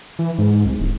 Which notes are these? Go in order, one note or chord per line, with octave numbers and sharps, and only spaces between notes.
E3
G#2
C2
D1